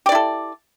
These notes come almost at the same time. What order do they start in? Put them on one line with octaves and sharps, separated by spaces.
G4 D5 E4 A4